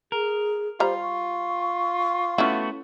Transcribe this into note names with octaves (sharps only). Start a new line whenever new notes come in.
G#4 A#4
G3 F4 C5 A#5
C#6
A3 B3 C#4 E4 F#4